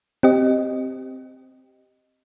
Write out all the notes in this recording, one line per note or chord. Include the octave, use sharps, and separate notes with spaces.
C4 G4 D#5